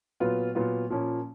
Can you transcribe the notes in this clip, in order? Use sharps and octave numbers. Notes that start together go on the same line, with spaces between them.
A#2 F#3 B3 F4
A#2 F#3 B3 F4
A#2 F3 A#3 C#4